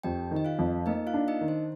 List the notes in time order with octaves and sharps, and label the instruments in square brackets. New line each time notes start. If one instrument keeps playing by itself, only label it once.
[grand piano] F2 [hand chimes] G4 G5
[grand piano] D#3
[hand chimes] D#5
F4 F5
[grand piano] F2
[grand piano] A#3 [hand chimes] D#4 D#5
[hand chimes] F4 F5
[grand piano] D4
[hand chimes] D#4 D#5
[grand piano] D#3
[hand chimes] C5